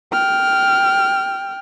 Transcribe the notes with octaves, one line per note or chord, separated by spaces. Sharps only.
G5 F6